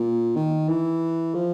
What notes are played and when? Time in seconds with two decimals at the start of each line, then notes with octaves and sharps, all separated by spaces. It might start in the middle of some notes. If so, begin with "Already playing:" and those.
Already playing: A#2
0.36 D#3
0.69 E3
1.34 F3